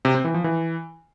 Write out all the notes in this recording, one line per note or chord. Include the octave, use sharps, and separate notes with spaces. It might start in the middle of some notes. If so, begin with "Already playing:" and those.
C3
C4
E3
F3
E3